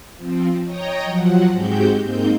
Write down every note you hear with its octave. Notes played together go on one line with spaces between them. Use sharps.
F3 C4
C#5 D#5 G5 A#5 D#6
F3 F#3 F#5
G#2 G#3 C4 F#4 G4 G6
G#2 A#3 C4 D#4 G6